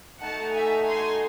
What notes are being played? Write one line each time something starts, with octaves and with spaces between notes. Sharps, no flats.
A3 D#4 F#4 A4 F#5 A5
E5 G#5
G#5 C6